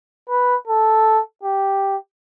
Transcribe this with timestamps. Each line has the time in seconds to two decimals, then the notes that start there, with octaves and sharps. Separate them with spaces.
0.29 B4
0.67 A4
1.43 G4